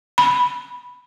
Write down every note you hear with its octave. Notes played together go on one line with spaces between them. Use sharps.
B5